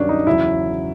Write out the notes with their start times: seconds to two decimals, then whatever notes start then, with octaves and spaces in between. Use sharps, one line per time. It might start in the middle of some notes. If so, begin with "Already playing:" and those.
Already playing: G2 D#3 F#3 C#4 D4
0.09 D#4
0.27 E2 C#3 F#3 E4